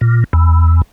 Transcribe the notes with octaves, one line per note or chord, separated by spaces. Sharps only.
A#2
E2